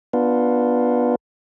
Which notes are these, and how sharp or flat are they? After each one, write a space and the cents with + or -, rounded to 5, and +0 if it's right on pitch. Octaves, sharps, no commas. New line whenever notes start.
B3 -15 D4 +0 F4 +0